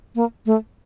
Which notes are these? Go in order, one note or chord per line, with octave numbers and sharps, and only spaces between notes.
A#3
A3